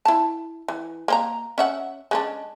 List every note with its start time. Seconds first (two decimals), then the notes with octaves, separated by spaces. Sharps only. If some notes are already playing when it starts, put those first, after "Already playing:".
0.05 E4 A5
0.68 E3
1.08 A#3 C5 A#5
1.58 C#4 E5 F#5
2.11 G#3 C#4 D4